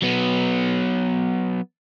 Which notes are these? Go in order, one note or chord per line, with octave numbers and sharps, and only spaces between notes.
F#3 B3